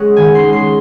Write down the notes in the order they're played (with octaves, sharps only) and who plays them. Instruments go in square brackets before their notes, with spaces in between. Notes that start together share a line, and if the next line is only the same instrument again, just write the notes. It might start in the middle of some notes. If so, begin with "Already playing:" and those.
Already playing: [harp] G#3 C#4 F#5
D#3 G#5
C6
G#3 C#4
C6